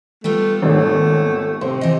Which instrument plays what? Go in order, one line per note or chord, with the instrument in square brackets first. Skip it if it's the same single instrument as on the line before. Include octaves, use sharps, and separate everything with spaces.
[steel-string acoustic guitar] G3 B3 F4 [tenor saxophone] A3
[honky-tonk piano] G#1 D#2 C#5 [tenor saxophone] A3
[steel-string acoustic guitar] A2 [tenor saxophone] C3 [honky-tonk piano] C5
[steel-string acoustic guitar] E3 D#5